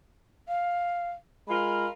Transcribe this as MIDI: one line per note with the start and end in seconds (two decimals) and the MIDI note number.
0.48 1.11 77
1.48 1.87 56
1.48 1.87 65
1.48 1.87 70
1.48 1.86 83